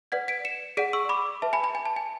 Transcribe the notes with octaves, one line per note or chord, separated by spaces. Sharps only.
B4 D5 F#5 G#6 B6
B6 D7
C#7 E7
G#4 D5 F#5 B6 D7
C#6 E6
B5 D6
B4 E5 A5
G#5 B5
G#5 B5
G#5
A5
G#5